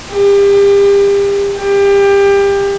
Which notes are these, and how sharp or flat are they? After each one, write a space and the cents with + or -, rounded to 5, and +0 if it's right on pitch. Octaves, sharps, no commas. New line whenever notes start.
G4 +35
G4 +25